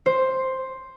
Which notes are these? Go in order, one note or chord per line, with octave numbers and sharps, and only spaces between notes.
C5